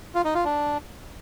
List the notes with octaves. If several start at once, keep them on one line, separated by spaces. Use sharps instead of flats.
F4
D#4
F4
D4